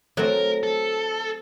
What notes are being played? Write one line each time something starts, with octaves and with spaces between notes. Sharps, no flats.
F#3 A3 C4 A#4
A4